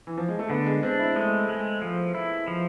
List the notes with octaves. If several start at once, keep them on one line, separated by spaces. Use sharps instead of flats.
E3
F3
G#3
A3
D3 B3
G#3
C4 D4
E4
G#3 A3
G#3
F3
E4
F3